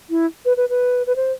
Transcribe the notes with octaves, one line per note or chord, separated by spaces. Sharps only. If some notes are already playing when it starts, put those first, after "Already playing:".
E4
B4
B4
B4
B4
C5